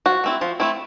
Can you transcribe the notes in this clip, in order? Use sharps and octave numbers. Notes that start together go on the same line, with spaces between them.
F3 F#4
A3 C4 E4
F3
A3 C4 E4